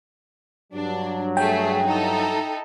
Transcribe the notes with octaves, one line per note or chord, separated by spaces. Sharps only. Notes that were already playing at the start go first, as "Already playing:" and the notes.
G2 F#3 D4
A3 G#4 G5
D#4 E4 A4